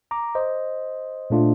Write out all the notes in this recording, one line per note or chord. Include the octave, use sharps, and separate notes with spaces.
A#5 D6
C5 D#5
A#2 A3 D4 F4